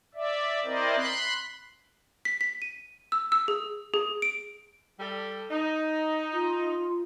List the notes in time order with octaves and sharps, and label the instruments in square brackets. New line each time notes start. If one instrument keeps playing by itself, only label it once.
[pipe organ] D5 E5
C4 E4 A#4 C5 D5 D#5
B5 C6 F#6
[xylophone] B6
B6
D#7
E6
E6
G#4
G#4
D7
[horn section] G3 A4
D#4
[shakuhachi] F4